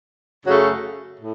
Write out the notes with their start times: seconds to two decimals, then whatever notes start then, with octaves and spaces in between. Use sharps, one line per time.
0.44 F#2 C#3 F#3 A3 C#4
1.18 A2